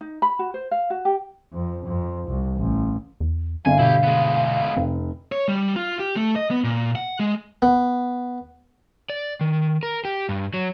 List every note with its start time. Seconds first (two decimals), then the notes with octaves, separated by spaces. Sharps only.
0.01 D#4
0.22 B5
0.39 F#4
0.54 C5
0.71 F5
0.90 F#4
1.05 G4
1.53 F2
1.86 F2
2.28 C2
2.58 A1
3.20 E2
3.66 G1 F5 G#5
3.80 B2 E4 G4
4.04 G#3 B3
4.77 F1 C4
5.32 C#5
5.49 G3
5.76 F4
5.99 G4
6.16 A3
6.36 D#5
6.51 B3
6.64 A#2
6.95 F#5
7.20 G#3
7.62 B3
9.10 D5
9.41 D#3
9.83 A#4
10.05 G4
10.29 G2
10.54 F#3